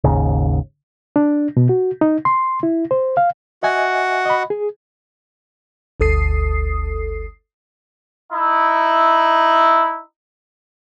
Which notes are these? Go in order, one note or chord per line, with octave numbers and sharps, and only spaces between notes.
G#1 D#2 G#2 C#3
D4
B2
F#4
D#4
C6
E4
C5
F5
F#4 D#5 E5 F#5 G#5
D#5 B5
G#4
G1 D2 A4 D#6 C7
D#4 E4